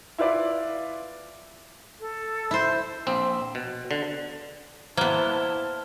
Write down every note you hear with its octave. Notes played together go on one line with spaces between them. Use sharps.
E4 F4 B4 D5
A4
E4 C5
A#1 C4
B2
D3
A#3 B3 E4 C5 A5 F6 G#6 G7